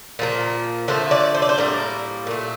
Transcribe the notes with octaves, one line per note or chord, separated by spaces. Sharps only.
A#2 F3 A#3
D3 F3 A3 C5
D5
C5
D5
C5
A2 G3 A#3 A#4
A#2 A3